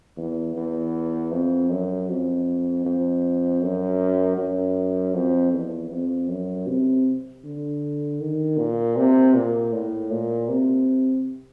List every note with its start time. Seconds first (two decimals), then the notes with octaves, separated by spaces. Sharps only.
0.17 E2
0.56 E2
1.32 F2
1.70 F#2
2.09 F2
2.85 F2
3.62 F#2
4.37 F#2
5.14 F2
5.53 E2
5.91 F2
6.28 F#2
6.67 C3
7.44 D3
8.20 D#3
8.58 A#2
8.96 C3
9.34 A#2
9.73 A2
10.11 A#2
10.49 C3